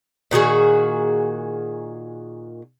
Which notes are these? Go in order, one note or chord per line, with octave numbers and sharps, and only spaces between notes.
A#2 D#3 F#4 G#4